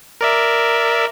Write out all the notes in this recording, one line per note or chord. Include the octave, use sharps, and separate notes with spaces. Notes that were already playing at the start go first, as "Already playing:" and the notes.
A#4 D5 E5